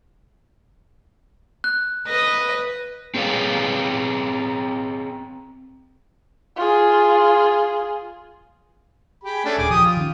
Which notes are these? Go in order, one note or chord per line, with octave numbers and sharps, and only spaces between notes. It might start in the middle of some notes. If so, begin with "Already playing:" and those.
F#6
B4 D#5
C4 G#4 B4 C#5 F5
F4 G#4
G4 G#4 B5
A3 C#4 D4
D#1 G#4 D6
F3 G4 D#6
F4
D#3 C#4